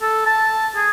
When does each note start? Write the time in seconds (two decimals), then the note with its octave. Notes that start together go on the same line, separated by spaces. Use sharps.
0.02 A4
0.26 A5
0.77 G#4